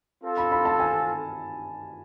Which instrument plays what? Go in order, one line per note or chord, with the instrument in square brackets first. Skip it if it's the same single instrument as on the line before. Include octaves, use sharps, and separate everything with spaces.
[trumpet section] C4 F4 A4
[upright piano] B5
B5
A5
G#5